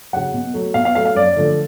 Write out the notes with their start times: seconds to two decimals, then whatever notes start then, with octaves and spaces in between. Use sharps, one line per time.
0.13 C#3 F#3 F#5
0.33 B2
0.54 F#3 A3
0.74 B2 F5
0.85 F5
0.95 F#3 A3 F5
1.06 F5
1.15 F#2 D5
1.36 D3 F3 A3